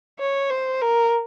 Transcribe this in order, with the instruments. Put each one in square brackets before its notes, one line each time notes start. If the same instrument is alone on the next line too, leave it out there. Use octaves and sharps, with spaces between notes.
[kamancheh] C#5
C5
A#4